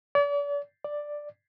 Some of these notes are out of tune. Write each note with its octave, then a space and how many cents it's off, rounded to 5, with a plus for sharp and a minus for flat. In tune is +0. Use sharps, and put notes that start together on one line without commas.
D5 -40
D5 +5